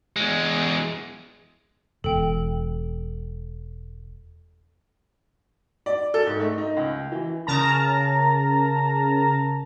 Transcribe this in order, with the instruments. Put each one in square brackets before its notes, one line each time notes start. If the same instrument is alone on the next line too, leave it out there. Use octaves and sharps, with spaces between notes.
[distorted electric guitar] E2 G#3
[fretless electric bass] E1 [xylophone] A4 G5
[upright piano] D5
A4
G#2
A3
D#4
C#2
E3
[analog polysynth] C#3 A#4 A5 A#5